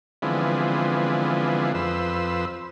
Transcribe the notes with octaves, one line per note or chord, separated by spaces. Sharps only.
D3 E3 F3 G#3 B3 C4
F2 B4 C5 E6